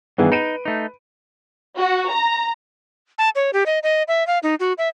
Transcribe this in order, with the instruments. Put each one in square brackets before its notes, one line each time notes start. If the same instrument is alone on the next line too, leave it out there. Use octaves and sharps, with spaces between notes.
[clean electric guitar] G2 D#3 E3 [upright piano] B3 G#4
[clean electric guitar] D#4 [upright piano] B4 D7 D#7
[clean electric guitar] A3 D#4
[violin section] F#4
A#5
[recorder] A5
C#5
G4
D#5
D#5
E5
F5
D#4
F#4
E5